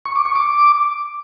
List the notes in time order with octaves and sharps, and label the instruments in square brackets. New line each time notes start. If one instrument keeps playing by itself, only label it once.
[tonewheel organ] C#6
D6
C#6
D6